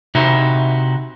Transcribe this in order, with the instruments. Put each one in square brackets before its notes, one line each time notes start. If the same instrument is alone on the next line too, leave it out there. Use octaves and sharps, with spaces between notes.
[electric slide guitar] C3 D#4 E4 F#4